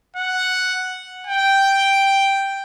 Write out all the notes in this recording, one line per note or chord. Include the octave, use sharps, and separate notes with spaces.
F#5
G5